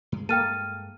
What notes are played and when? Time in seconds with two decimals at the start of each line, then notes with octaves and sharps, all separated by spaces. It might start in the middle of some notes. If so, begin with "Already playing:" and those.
0.12 G2 G#3
0.29 A#3 A4 G5 A5 F6 D#7